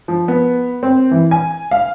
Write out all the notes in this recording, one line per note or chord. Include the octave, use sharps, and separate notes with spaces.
F3
B3
C4
E3
G#5
F5